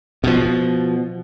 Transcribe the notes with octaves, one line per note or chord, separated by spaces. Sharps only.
B2 F3